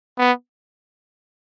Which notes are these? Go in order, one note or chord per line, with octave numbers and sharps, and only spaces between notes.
B3